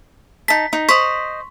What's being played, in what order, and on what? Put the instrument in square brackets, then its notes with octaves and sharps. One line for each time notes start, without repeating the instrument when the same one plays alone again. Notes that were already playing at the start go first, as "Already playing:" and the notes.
[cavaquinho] D#4 A5 [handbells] B6
[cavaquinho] D#4
[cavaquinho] C5 D#5 [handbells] C6 C#6 B6